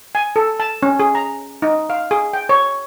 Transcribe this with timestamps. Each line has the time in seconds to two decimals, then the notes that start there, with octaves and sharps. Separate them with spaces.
0.15 G#5
0.36 A4
0.60 A5
0.83 C#4
1.00 G#4
1.15 A#5
1.62 D#4
1.90 F5
2.11 G#4
2.33 G5
2.49 C#5